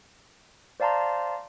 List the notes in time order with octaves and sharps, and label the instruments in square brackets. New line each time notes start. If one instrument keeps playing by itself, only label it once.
[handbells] C5 D5 F5 A5 A#5 C6